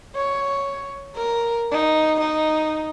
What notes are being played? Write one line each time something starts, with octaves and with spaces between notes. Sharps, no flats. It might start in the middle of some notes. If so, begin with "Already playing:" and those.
C#5
A#4
D#4
D#4